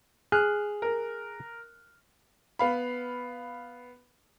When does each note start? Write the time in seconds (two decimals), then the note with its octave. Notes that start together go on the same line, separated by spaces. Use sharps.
0.32 G#4 F6 F#6
0.82 A#4
2.59 B3 F5 B5